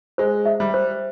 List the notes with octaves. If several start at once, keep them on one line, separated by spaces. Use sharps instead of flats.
G#3 C5
E5
G3
C5